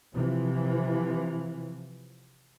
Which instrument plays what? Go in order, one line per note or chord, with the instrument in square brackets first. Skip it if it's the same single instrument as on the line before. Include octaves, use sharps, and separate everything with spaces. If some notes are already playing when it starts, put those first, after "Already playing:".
[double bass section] C3 E3 F3